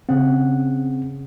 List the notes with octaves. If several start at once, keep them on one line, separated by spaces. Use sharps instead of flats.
C#3 C4 F#5